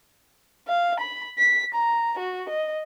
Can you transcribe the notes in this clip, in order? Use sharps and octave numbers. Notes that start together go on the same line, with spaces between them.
F5
B5
B6
A#5
F#4
D#5